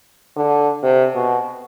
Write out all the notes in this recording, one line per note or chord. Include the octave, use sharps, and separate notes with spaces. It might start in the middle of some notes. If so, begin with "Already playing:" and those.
D3
C3
B2